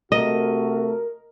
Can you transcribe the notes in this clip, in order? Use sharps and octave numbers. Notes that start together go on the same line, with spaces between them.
C3 A3 F#4 A#4 D#5